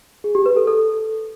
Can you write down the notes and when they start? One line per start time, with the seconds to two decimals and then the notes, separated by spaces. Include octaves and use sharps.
0.24 G#4
0.35 G4
0.46 B4
0.57 A4
0.67 A4